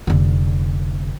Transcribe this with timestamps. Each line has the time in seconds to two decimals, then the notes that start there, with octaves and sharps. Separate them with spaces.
0.07 F1 D3